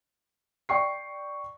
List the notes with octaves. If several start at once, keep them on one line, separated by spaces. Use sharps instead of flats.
D5 G5 C#6 C7